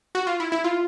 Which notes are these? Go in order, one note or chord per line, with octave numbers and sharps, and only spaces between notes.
F#4
F4
E4
E4
F4